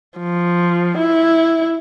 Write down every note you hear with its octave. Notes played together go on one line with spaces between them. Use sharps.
F3
E4